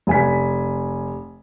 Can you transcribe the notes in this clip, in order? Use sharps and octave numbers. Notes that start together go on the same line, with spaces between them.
F1 G#5 B6